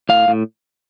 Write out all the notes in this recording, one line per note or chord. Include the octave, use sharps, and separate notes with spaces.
A2 F5
A2